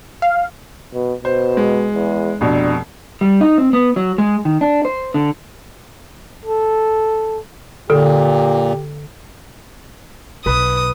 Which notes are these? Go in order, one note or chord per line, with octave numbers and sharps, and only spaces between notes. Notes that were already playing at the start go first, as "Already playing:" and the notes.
F5
B2
B2 C5
G#3
E2
F1 B2 D4
G3
D#4
C4
B3
F#3
G#3
D#3
D4
C5
D3
A4
A#2 D3 G4 A4
B1 B4 D#6